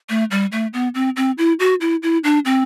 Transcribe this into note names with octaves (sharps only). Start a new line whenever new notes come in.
A3
G3
A3
B3
C4
C4
E4
F#4
E4
E4
D4
C4